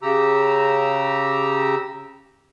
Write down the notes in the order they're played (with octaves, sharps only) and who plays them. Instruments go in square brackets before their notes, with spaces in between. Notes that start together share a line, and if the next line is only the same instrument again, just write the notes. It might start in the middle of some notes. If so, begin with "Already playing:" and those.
[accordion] C#3 G4 A#5 E6